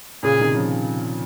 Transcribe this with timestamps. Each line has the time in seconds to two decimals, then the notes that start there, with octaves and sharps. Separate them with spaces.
0.23 A#2 C#3 G#4
0.39 C3 D#3
0.55 C#3 F3